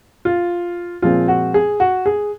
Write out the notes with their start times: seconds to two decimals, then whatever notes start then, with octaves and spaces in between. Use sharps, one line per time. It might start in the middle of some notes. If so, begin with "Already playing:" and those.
0.25 F4
1.02 A#2 F3 G#3 C4 F4
1.28 F#4
1.54 G#4
1.80 F#4
2.06 G#4